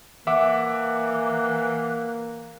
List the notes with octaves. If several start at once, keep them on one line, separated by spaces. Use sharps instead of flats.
E3 A#3 E5 F#5 D6